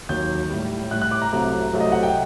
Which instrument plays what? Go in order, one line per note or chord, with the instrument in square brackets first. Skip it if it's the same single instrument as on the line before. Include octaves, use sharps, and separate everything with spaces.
[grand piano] D#2 D#3 F#3 G6
A2 G3
A2 G3 F#6
F#6
D6
A#5
C2 C3 F#3 A3 A#5
C2 C3 F#3 A3
D#5
F#5
G5